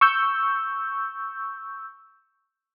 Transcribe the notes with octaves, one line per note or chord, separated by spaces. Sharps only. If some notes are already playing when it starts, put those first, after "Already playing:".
C#6 E6 G6